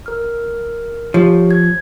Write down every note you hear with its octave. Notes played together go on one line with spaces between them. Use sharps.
A#4 F6
F3 G4 C#5
G#6